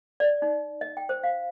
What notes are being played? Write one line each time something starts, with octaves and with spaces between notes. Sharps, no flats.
D5
D#4
D#5
G5
C5
F5